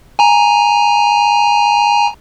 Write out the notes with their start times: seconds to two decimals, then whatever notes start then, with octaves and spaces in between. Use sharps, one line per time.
0.19 G#5 A#5